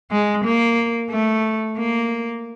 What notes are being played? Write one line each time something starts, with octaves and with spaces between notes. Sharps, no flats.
G#3
A#3
A3
A#3